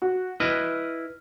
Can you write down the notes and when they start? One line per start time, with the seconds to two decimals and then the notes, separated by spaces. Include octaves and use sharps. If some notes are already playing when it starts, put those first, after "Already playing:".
0.02 F#4
0.40 E4 B4 D#5 F6 D#7